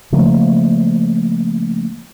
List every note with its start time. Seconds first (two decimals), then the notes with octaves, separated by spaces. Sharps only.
0.12 C#3 F3 A3 A#3